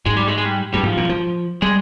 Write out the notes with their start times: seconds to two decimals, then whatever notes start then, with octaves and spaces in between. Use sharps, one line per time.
0.06 G#2 G#3
0.17 G3
0.27 G#3
0.38 G#3
0.45 G3
0.74 G2 G3
0.83 G#2 F3
0.97 A#2
1.09 F3
1.62 G3 G#3